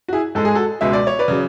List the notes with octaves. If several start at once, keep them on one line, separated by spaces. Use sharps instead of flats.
F#4
E4 G#4
G#2 G#3 A4
G#4
F#4 A4
C#2 B2 G#3 E5
D5
C#5
B4 D5
C#3 F#3